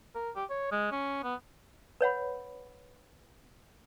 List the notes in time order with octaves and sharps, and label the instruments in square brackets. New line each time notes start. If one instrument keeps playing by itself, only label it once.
[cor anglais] A#4
G4
C#5
G#3
C#4
B3
[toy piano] B4 C#5 F#5 B5